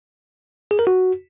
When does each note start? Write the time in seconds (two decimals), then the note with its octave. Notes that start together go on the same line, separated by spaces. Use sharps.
0.71 G#4
0.79 A#4
0.87 F#4